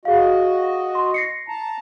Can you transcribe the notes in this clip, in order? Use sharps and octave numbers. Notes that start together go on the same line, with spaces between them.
F#4 G#4 D#5 F5
C6
A#6 C7 C#7
A5 A#5